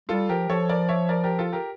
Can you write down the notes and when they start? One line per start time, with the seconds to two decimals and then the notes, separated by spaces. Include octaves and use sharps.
0.09 G3 F4 A4
0.29 F3 G4 A#4
0.49 F3 A4 C#5
0.69 A#4 D5
0.89 C#5 E5
1.09 A#4 D5
1.24 G4 A#4
1.39 F4 A4
1.53 G4 A#4